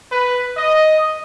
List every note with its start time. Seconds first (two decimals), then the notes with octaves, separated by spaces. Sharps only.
0.12 B4
0.57 D#5